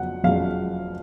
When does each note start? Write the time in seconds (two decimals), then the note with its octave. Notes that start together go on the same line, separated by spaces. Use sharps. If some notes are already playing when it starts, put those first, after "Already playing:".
Already playing: F2 C#3 F#3 F#5
0.24 F#1 F2 C#3 F#3 F5